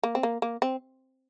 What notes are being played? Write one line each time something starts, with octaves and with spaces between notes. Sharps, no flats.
A#3
C4
A#3
A#3
C4